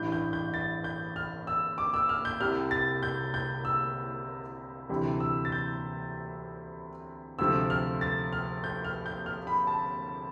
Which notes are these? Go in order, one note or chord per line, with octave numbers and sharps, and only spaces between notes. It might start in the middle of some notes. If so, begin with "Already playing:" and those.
Already playing: A1 G2 E3 G6
G6
G6
A6
G6
F6
E6
D6
E6
F6
G6
C2 C3 G3 F6
A6
G6
G6
E6
D2 C3 E3 G3
E6
A6
G6
D2 C3 F3 A3 E6
F6
A6
F6
G6
F6
G6
F6
B5
A5